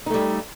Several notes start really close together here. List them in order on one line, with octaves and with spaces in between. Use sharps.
D#4 A3 G3